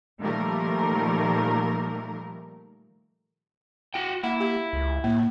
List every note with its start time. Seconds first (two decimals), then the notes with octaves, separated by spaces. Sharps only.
0.20 A#2 D#3 F3 G3 A3 A#4
3.94 F#4 G5
4.23 A#3 E4 F#5
4.40 G4
4.73 C#2
5.04 A2 A#3